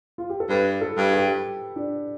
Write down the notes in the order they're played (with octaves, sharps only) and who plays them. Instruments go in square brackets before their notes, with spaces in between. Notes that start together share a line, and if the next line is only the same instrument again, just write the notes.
[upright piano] F4
G4
A4
[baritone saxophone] G2 [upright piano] B4
[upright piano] A4
[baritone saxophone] G2
[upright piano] G4
D4